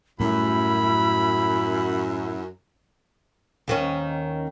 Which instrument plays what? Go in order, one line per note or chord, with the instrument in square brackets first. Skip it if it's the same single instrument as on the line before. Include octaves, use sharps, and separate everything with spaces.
[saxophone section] F#2 [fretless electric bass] A2 G3 A3 [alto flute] E4 [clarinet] B5
[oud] D#2 D#3 C#4